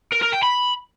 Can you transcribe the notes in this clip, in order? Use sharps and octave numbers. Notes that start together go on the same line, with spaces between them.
A#4
A#4
G5
B5